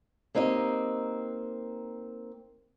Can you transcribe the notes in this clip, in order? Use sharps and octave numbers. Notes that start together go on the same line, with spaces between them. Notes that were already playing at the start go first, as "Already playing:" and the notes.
A#3 C4 D#4 G4 D#5